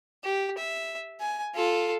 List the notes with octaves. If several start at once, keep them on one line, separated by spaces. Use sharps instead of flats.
G4
E5
G#5
F4 A4